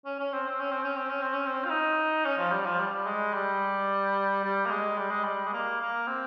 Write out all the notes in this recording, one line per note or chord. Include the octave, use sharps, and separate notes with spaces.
C#4
C#4
C4
C4
C#4
C4
C#4
C4
C#4
C4
C#4
C4
F4
D#4
C#4
F3
G3
F3
G3
G#3
G3
G3
A#3
G#3
G3
G#3
G3
G#3
A#3
A#3
C4